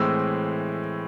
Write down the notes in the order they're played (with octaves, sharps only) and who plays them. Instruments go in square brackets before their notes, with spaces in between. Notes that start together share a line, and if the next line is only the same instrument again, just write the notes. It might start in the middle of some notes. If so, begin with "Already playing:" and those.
Already playing: [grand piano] A2 E3 G#3 C4 E6